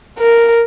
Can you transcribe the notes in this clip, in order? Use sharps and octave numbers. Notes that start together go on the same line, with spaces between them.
A#4